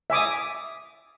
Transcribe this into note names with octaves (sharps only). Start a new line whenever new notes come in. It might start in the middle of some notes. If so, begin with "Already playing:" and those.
E5 G#5 D6 D#6